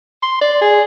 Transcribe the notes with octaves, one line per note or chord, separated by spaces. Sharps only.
C6
D5
G#4